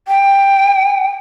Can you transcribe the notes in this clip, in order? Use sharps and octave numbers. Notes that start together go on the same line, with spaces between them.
G5